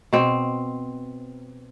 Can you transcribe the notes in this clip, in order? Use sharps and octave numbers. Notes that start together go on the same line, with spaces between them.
B2 C4